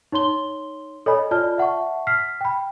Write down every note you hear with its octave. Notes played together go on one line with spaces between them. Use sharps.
D#4 C#5 C6 G7
A4 C#5 D#5 G#5 B5
F4 D5 A5 F6
E5 F#5 A5 C#6
F6 B6 C7
G5 B5